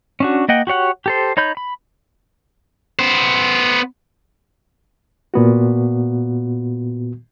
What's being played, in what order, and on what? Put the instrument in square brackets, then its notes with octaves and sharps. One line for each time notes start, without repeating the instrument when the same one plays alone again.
[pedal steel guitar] C#4 D4 F#4
A#3 D#5 F#5 G5
F#4 G4 C#5 F#5
G4 A4 C5
D#4 C#5 B5 G6
B5
[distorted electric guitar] B3 C5
[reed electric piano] A#2 B3 F#4